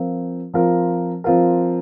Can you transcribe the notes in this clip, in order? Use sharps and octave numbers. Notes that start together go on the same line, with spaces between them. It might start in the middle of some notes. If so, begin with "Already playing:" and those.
Already playing: F3 C4 F4 A#4
F3 C4 F4 A#4
F3 C4 F4 A#4